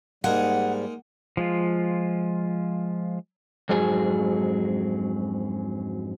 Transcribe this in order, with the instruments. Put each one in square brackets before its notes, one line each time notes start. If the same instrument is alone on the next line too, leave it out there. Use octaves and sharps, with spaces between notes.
[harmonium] G#2 G3 [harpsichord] G#3 A#3 D#4 [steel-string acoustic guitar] F#5
[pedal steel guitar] F3 G#3 F4
[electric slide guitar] F2 G#2 F#3 G#4